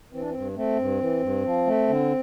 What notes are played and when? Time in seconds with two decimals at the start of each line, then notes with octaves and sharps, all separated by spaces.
0.12 E3 C4
0.21 D4
0.29 G2 C4
0.56 A3 C4
0.78 G2
1.00 E3
1.22 G2
1.44 F3
1.67 A3
1.88 D3